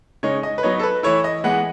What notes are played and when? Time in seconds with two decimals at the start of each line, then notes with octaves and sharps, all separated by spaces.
0.23 C#3 G#3 D#4 C#5
0.43 D#5
0.58 B4
0.63 F#3 B3 D#4 C#5
0.79 A4
0.83 B4
1.03 E3 A3 E4 C#5
1.24 D#5
1.44 E3 G#3 B3 F#5